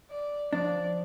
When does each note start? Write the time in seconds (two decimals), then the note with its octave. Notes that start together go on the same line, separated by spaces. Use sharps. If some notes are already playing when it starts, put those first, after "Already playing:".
0.11 D5
0.53 F3 D4 D5